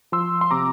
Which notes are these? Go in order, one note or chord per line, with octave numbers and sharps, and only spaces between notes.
F3 C6 E6
C6
C3 A#5 D6